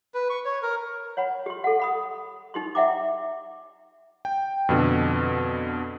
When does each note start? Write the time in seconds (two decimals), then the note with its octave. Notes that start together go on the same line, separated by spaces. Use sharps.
0.14 B4
0.30 C#6
0.45 C#5
0.63 A#4
1.17 C#5 F#5 B5
1.46 G4 C6
1.64 A4 F#5
1.80 F#5 B5 D#6
2.54 D#4 G4 C6
2.75 D5 E5 F#5 G5 A#5 D6
4.25 G5
4.69 F2 B2 D3